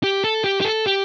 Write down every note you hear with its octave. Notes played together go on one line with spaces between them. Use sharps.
G4
A4
G4
G4
A4
G4